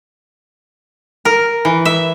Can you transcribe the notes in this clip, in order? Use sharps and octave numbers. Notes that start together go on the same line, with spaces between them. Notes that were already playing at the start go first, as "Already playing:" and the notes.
A#4
E3
E5